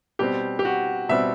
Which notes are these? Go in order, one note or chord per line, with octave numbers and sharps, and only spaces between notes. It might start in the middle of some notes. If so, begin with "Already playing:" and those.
B2 G3 C4 G4
G4
F#4
B2 G3 C4 E5